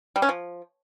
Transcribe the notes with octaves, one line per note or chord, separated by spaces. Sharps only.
G3
C#4
F3